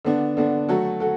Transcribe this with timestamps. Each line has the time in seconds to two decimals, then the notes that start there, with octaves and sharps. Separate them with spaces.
0.05 D3 B3 D4
0.37 D3 B3 D4
0.69 F#3 A3 F#4 A4
1.00 F#4 A4